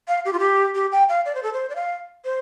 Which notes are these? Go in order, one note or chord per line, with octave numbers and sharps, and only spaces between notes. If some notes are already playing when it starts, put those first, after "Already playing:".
F5
G4
F4
G4
G4
G5
F5
D5
C5
A4
C5
D5
F5
C5